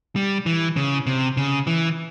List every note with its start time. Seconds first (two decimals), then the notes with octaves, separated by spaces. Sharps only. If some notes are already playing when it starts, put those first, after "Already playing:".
0.16 G3
0.46 E3
0.76 C#3
1.06 C3
1.37 C#3
1.67 E3